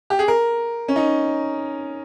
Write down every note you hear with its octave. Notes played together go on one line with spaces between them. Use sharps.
G4
G#4
A#4
C#4
D#4